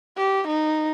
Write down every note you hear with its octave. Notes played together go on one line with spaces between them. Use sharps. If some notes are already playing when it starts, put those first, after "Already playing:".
G4
D#4